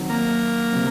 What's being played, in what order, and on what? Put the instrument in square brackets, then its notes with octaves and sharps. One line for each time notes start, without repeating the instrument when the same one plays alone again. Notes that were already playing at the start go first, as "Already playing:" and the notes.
Already playing: [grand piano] D#3 F#3 C4 F#4
[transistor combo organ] A#3
[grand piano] C3 F#3 C4